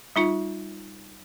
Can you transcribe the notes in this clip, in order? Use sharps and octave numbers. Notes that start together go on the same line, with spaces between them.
G3 D#4 F4